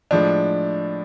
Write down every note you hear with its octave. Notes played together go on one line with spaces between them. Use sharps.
A2 F3 G#3 D4